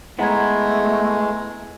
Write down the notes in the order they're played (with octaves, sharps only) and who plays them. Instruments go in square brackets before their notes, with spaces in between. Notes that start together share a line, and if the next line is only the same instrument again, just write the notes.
[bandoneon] G#3 [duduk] A3 [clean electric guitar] B3 E4 [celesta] F#5 A#5 G#6